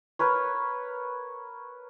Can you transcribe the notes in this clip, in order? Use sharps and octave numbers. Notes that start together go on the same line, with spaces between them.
A#4 B4 C#5